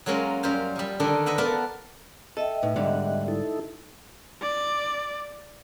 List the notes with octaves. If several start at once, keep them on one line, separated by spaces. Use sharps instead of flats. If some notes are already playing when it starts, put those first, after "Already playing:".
F#3 G#3 A#3 C#4 F4
F#2 G3 F4 C5 F5
F3 G3
D3 D#3 D4 A4 A#4
B4 D#5 E5 F#5 B5
B3 F4 A#4 D5 F#5 A5
A4 D#5 E5 G5
A2 D#4 B4
G#2 D3 G3 F#5
D#4 E4 A4
D5